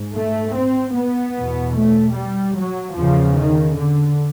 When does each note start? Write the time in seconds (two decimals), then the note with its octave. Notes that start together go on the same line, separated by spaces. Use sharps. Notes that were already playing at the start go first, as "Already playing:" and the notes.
Already playing: G#2
0.15 A3
0.55 C4
0.95 B3
1.36 E2 B2
1.76 A3
2.15 G3
2.56 F#3
2.96 E2 C#3 F3
3.37 D#3
3.77 D3